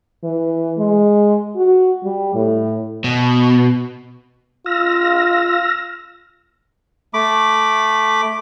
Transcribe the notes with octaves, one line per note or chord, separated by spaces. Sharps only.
E3
G#3
F#4
G3
A2
B2
F4 E6 F6 A#6
A3 B5 D6